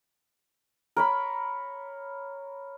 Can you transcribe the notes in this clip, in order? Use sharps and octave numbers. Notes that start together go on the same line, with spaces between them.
A#4 C#5 B5